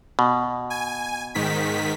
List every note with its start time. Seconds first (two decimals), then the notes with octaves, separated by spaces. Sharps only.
0.19 B2
0.70 G#5
1.35 G#2 D#3 B6